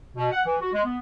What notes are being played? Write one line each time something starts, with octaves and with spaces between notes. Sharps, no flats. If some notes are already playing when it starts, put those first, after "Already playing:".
B2
F#5
E3
F#4
G#3
B3